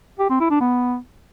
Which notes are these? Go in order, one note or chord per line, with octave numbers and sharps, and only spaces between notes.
G4
C4
E4
D4
B3